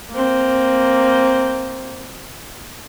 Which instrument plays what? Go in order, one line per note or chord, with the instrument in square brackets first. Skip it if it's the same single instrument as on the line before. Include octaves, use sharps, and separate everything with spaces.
[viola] A#3 C4